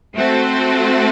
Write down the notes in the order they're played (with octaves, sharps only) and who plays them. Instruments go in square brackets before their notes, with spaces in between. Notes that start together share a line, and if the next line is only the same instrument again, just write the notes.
[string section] A3 C4 F#4 A4 C5